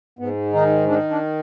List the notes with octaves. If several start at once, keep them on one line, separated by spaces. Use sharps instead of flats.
G#2 B3
D#3 D#4
D#3 D4
D4